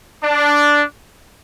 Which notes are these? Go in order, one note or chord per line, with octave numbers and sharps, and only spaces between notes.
D4